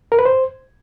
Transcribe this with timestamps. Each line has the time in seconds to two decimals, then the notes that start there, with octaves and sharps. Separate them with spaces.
0.12 A#4
0.19 B4
0.25 C5